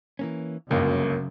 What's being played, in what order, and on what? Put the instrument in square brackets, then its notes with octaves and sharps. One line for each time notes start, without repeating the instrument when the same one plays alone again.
[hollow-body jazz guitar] E3 A#3 C#4
[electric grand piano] G1 C#2 [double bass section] F#2 [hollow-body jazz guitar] C#3 [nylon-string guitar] A#3